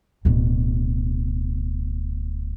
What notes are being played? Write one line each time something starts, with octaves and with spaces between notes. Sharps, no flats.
D1 B2